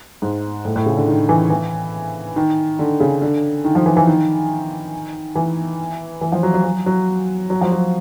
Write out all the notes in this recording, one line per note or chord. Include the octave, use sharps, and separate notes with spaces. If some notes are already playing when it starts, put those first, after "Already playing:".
G#2
A2
A2
C#3
D3
D#3
E3
E3
D#3
D3
C#3
D3
D#3
F3
E3
E3
D#3
E3
E3
F3
F#3
F#3
F#3
F#3
F#3
F3
F#3